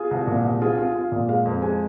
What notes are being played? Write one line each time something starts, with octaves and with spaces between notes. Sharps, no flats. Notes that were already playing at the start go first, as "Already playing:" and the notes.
Already playing: F4 G#4
C2
A#2
C2
F4 G#4
F4
F4
A#2
G#3 F5
F2
G#3 G#5